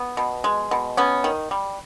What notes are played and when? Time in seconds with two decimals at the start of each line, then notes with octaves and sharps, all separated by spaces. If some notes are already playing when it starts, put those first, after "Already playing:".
Already playing: B3
0.17 B2
0.44 G#3
0.71 B2
0.97 B3 C#4
1.24 D#3
1.51 G3